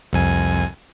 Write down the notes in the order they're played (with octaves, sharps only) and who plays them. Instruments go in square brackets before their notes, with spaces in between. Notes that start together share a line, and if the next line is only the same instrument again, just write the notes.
[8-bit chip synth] C2 F2 G#5